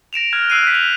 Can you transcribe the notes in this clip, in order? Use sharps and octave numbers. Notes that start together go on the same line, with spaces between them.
A#6 D7 E7 F7
F6 F#6 G#6
E6 F#6 C7 D7 D#7
G6 B6
F7